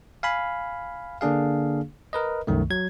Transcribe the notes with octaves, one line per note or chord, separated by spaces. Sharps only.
F5 G#5 B5
D3 A#3 D4 G#4 F5
A#4 B4 D#5
C2 F#2 D#3 A3
F#3 G#6